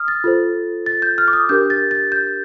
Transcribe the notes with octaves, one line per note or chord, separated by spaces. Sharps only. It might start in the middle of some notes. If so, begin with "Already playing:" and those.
Already playing: D#6 F6
A6
F4 A4 C5
A6
G6
F6
D6
D#6
D4 G4 A#4 G6
A6
A6
G6